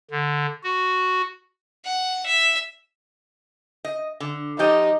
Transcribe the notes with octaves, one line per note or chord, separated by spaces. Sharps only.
D3
F#4
F#5
E5
D#5
D3
F3 D#4 G4 D#5